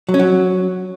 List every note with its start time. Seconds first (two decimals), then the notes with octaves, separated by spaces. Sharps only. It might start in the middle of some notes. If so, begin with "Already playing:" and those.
0.09 F#3
0.14 C#4
0.19 F#3